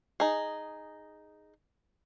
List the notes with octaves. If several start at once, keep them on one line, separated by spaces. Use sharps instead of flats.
D#4 G#4